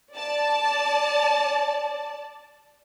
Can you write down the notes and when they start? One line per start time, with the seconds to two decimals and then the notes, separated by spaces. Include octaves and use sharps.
0.14 D5 A5